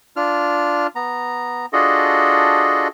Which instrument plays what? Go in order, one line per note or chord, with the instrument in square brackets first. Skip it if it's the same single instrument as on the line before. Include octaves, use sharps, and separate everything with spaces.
[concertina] D4 F4 F6
B3 A#5
D4 F4 F#4 G#4 A4 D#5